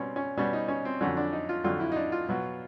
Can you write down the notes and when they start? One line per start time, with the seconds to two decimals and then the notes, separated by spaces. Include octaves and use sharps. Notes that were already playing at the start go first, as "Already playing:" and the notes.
Already playing: B2 G3 C4 C#4
0.16 C#4
0.37 B2 G3 C#4
0.53 D#4
0.68 C#4
0.85 C4
1.01 F2 D3 F#3 C#4
1.17 D4
1.33 D#4
1.49 F4
1.64 F2 D3 F#3 F4
1.80 E4
1.92 D#4
1.96 D4
2.12 F4
2.29 B2 F#3